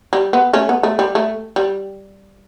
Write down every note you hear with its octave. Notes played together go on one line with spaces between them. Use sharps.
G3
B3
A3 C#4
B3
A3
G3
A3
G3